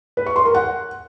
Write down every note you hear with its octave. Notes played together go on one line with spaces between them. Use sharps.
B4
C#6
C6
A#4
F#5